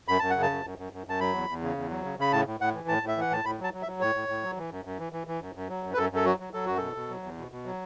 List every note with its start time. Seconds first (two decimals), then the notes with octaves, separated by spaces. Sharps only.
0.08 F#2 B5
0.19 F#2 A5
0.30 F#5
0.36 C#3
0.42 A5
0.50 F#2
0.64 F#2
0.78 F#2
0.93 F#2
1.07 F#2 A5
1.20 F#3 B5
1.34 E2
1.49 E2
1.62 C#3
1.76 E2
1.90 F#3
2.04 C#3
2.19 C#3 B5
2.32 A2 A5
2.47 A2
2.60 A2 F#5
2.75 E3
2.88 A2 A5
3.03 A2
3.08 E5
3.17 E3 F#5
3.30 A2 A5
3.44 A2 B5
3.59 F#3 A5
3.74 F#3
3.82 E5
3.87 F#3
4.00 A2 C#5
4.15 A2
4.29 A2
4.43 F#3
4.57 E3
4.71 F#2
4.85 F#2
4.99 E3
5.13 E3
5.27 E3
5.41 F#2
5.55 F#2
5.69 F#3
5.83 F#2
5.94 B4
5.97 F#2 A4
6.12 F#2 A4
6.25 F#3 F#4
6.40 F#3
6.54 F#3 A4
6.66 F#2 F#4
6.77 B2 A4
6.96 B2
7.09 F#3
7.23 E2
7.38 B2
7.52 B2
7.66 F#3